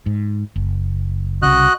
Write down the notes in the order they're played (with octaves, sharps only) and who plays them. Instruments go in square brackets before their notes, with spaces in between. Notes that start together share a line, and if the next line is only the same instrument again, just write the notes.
[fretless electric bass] G#2
F#1
[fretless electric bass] C2 C#3 [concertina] F#4 D#5 F#6